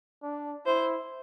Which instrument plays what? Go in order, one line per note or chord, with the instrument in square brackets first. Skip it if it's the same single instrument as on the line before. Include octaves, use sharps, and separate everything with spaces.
[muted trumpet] D4
[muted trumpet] E4 [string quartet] C5